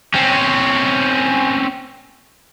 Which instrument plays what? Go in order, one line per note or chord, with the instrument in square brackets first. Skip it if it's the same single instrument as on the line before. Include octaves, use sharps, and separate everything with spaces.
[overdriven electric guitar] C4 C#4